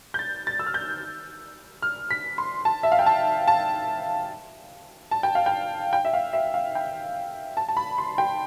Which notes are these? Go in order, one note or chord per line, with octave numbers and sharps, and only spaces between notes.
G6
A6
A6
E6
F6
G6
F6
B6
C6
A5
E5
F5
G5
A5
A5
A5
G5
F5
G5
G5
E5
F5
E5
F5
G5
A5
A5
B5
C6
G5